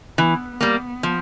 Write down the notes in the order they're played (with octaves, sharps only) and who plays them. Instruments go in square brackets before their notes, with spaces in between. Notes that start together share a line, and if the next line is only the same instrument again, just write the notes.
[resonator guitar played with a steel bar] E3 [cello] B3
[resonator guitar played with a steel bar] G3 A#3 [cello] B3
[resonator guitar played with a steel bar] F3